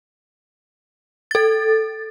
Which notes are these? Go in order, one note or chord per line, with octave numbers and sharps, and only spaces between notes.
A4 A6